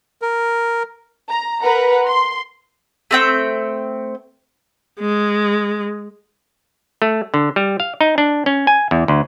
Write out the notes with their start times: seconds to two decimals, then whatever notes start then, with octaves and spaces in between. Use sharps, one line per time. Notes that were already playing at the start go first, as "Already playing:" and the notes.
0.22 A#4
1.29 A#5
1.62 A#4 B4 F#5 A#5
2.07 C6
3.11 A3 C4 G5
5.00 G#3
7.02 A3
7.34 D3
7.56 G3
7.80 F5
8.01 D#4
8.18 D4
8.46 C#4
8.67 G#5
8.91 E2
9.08 D2